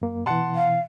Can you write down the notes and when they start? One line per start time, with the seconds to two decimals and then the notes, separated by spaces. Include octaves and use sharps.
0.02 F#2 A#3
0.26 B2 E3 F#5 A5 C6
0.55 F5